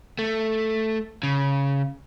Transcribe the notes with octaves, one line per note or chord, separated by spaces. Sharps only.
A3
C#3